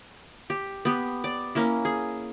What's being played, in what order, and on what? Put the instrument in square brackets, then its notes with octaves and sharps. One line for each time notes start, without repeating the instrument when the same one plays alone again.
[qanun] G4
B3 G4
D5
A#3 C#4 E4
G#4